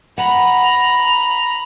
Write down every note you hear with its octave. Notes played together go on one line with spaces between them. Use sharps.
F#5 A#5 B5